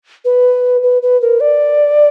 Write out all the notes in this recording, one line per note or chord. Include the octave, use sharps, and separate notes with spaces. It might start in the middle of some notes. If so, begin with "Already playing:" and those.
B4
B4
B4
A#4
D5